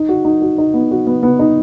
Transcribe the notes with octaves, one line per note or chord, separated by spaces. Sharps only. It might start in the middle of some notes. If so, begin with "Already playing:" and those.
Already playing: D#4
F#4
D#4
F#4
D#4
B3
F#4
B3
B3
D#4